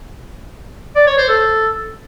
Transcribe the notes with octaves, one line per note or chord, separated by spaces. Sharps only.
D5
C#5
C5
A4